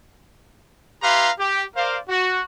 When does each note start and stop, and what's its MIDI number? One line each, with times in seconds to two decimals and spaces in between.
1.02 1.30 64
1.02 1.30 67
1.02 1.30 71
1.02 1.30 77
1.02 1.30 82
1.02 1.30 84
1.39 1.63 67
1.76 1.97 70
1.76 1.97 72
1.76 1.97 74
1.76 1.97 77
2.09 2.42 66